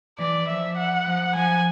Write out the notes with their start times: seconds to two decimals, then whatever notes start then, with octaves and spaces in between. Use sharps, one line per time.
0.18 E3 D5
0.48 F3 E5
0.77 F#5
1.06 F3
1.35 F3 G#5